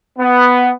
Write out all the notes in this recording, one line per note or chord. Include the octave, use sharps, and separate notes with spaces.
B3